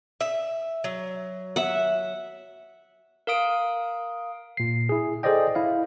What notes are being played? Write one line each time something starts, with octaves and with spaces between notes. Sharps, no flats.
E5
F#3
E5 F#5
A#4 F5 D#6 D7
A#2 C7
E4 G#4
G#4 A4 C5 D5 D#5 G5
E4 F5